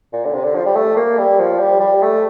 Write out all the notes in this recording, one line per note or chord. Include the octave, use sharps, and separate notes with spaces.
A#2
D3
C3
D3
F3
G3
A3
A#3
G3
F3
G3
G3
A3